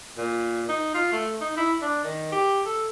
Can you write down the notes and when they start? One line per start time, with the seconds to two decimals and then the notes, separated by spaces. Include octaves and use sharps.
0.18 A#2
0.69 D#4
0.94 F4
1.13 A3
1.41 D#4
1.57 E4
1.82 D4
2.04 D#3
2.32 G4
2.66 A4